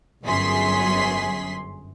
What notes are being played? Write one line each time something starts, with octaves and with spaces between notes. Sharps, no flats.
G1 F#2 G#4 C6 B6